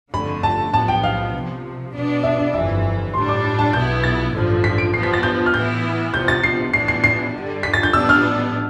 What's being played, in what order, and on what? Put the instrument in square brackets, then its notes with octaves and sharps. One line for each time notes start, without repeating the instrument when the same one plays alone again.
[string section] G1 F2 D3 A3 [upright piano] B5
[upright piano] A5
[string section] B1 A2 F3 B3 [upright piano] A5
[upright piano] G5
F5
[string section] C2 C3 F3
B2 B3 D4
[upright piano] E5
D5
[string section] G1 F2 E3 [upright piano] E5
[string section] A2 G3 D4 [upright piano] C6
[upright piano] D6
B5
A5
[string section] B1 B2 B3 E4 [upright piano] G6
[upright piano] A6
[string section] A1 G2 D3 F3
[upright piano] B6
D7
[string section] G2 F3 B3 [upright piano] C7
[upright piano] B6
A6
G6
F6
[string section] A2 E3 B3 E4 [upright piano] G6
[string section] C2 C3 F3 B3 [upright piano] G6
[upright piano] A6
C7
[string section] A2 E3 B3 D4 [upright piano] C7
[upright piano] C7
C7
[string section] G2 D3 G3
[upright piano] B6
A6
G6
[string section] A1 A2 G3 B3 D4 [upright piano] E6
[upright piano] F6